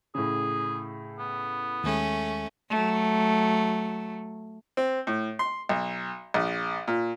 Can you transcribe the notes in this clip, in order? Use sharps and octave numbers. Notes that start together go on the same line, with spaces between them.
A2 C#3 G#4
B3
D#2 G#3 A3 C#4
F#3 A3
C4
A2
C6
B1
A#1
A#2